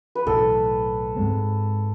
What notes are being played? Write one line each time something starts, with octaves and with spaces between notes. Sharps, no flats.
B4
B1 A2 E3 A4
G#2 G#3 C4